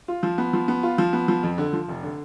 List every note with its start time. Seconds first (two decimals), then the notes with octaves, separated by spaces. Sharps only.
0.08 F4
0.23 F3
0.38 B3
0.53 F3
0.68 B3
0.83 F4
0.98 F3
1.13 B3
1.28 F3
1.43 F2
1.58 D3
1.73 F3
1.88 F1
2.03 D3